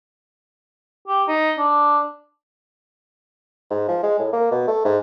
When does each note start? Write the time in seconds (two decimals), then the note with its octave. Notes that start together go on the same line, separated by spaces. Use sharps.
1.08 G4
1.28 D#4
1.58 D4
3.71 G#2
3.88 F3
4.03 G#3
4.19 A2
4.33 A#3
4.51 B2
4.68 A3
4.85 G#2